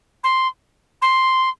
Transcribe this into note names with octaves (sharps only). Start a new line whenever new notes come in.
C6
C6